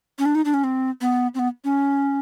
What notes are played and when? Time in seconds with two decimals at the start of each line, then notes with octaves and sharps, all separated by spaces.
0.19 C#4
0.25 D4
0.35 D#4
0.45 D4
0.54 C#4
0.64 C4
1.01 B3
1.35 C4
1.39 B3
1.64 C#4